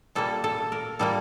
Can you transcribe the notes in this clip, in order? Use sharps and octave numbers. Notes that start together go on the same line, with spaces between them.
A#2 G3 A#3 A4
A4
A#4
A#2 G3 A#3 A4